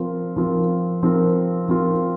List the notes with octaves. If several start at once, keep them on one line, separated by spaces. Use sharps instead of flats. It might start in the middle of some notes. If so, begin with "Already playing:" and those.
Already playing: F3 C4 F4 A#4
F3 C4 F4 A#4
F3 C4 F4 A#4
F3 C4 F4 A#4